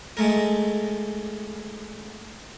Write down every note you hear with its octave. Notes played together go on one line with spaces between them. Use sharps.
G#3 A3 A#4